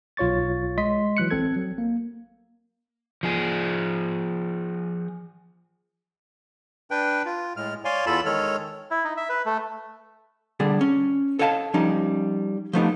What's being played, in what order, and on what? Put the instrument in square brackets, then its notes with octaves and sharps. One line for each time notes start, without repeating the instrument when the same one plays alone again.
[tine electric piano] B1 F4 C#5 C#6 A6
G#3 D#5 C6 B6
E3 F#3 F#6 C#7
A1 C4 A4 G#6
F#3
A#3
[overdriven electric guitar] F3 G#4
[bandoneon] D4 B4 G5
F4
A2 G#3 F6
C#5 D5 F5 G#5 C6
E2 F4 A4 A5 B5
D#3 G#3 A4 C#5 F6
[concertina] E4
D#4
E5
B4
A3
[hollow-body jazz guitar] D3 G3 G#4 A4
C#4
A4 C#5 D#5 F5 G5 A5
F3 G3 C#4 D#4
F3 G3 A3 B3 D#4 G4